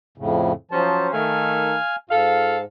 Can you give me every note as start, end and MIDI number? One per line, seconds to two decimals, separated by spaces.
0.18 0.52 41
0.18 0.52 45
0.18 0.52 49
0.71 1.07 53
0.71 1.12 54
0.71 1.12 61
0.71 1.12 72
0.71 1.07 81
1.13 1.75 51
1.13 1.75 57
1.13 1.96 77
1.13 1.96 80
2.10 2.65 44
2.10 2.56 65
2.10 2.56 69
2.10 2.56 77